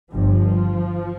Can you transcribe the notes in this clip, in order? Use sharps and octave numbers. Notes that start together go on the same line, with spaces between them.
G1 G2 F3